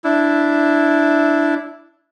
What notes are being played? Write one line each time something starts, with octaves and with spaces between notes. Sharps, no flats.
D4 E4